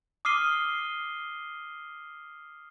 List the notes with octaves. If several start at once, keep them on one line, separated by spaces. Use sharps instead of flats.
D6 D#6 F6 C7 D#7 G7